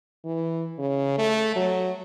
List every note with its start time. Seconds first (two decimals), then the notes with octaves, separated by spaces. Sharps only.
0.25 E3
0.79 C#3
1.18 A3
1.56 F#3